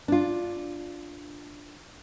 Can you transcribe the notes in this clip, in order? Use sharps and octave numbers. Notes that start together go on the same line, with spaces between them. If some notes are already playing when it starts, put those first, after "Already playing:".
D4 F4